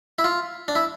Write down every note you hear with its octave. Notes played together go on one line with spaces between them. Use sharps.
E4
F4
D4
E4